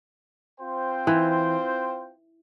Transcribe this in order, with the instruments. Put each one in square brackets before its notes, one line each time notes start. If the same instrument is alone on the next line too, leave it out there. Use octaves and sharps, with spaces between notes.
[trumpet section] C4 F4 C5 G5
[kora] E3